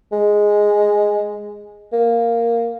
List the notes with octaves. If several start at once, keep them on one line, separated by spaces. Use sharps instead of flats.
G#3
A#3